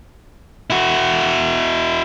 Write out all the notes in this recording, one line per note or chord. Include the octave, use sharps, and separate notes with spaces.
E4 F#4